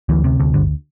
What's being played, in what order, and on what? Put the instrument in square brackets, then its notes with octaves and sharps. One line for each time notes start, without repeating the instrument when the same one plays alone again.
[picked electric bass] D2 E3
C3
D2
G1 D3